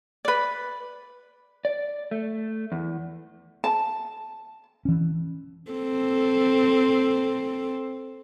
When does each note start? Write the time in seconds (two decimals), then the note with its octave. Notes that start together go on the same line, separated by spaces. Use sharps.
0.25 B4 D5
1.65 D5
2.11 A3
2.72 E2
3.64 A5
4.85 E3 C#4
5.71 C4 A4